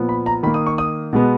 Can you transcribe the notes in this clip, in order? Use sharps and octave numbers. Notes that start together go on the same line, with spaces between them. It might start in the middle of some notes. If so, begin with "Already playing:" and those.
Already playing: A#2 F3 B3
B5
A#5
D#3 A#3 B5
D#6
C#6
D#6
B2 G#3 B3